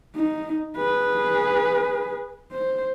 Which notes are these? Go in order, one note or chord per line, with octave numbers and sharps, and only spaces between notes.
D#4
G#4 B4
C5